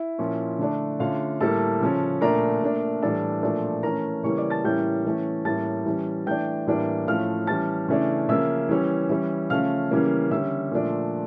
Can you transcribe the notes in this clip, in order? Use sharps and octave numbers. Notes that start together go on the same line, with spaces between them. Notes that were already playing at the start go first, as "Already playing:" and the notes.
Already playing: E4 E5
A#2 F3 C#4
D3 A3 D4
D3 A3 C#4 F4 F5
A2 G3 A#3 A4 A5
C#3 F3 C#4
A#2 A3 D4 A#4 A#5
A#2 A3 D4
A2 E3 G3 D4 A4 A5
A#2 F3 A3 D4
E3 A3 C#4 A#4 A#5
C#3 E3 G3 A#3 C#5 C#6
D5 D6
A5 A6
A2 E3 G3 A#3 C#4 G5 G6
E3 A3 C#4
A2 G3 A#3 C#4 A5 A6
E3 G3 C#4
E3 A3 D4 G5 G6
A2 E3 G3 A#3 D4
A2 F3 A3 C#4 F5 F6
E3 G3 C#4 A5 A6
C#3 E3 A3 D4
C#3 F3 A#3 E5 E6
E3 G3 C#4
E3 G3 C#4
C#3 F3 A3 C#4 F5 F6
C#3 E3 G3 A#3 C#4
D3 G3 C#4 E5 E6
A#2 F3 A3 D4